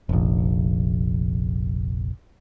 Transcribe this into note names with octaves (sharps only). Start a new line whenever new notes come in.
F1 A#1